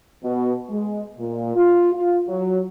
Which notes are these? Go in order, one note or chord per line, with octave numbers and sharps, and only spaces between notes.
B2
G#3
A#2
F4
F4
F#3